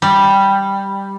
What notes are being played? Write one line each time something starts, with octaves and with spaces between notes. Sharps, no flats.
G3